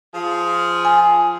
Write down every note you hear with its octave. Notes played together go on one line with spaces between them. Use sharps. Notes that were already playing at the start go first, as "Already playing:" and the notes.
F3 F4 G#4
G#5